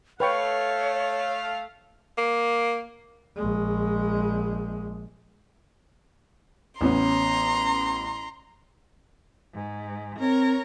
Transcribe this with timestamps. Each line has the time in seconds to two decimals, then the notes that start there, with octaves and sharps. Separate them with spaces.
0.20 A3 B4 C#5 F5 G5 C#6
2.18 A#3
3.36 A#1 G#3
6.81 A1 B3 C#4 A#5 C6
9.54 G#2
10.19 C4 A#4 C#5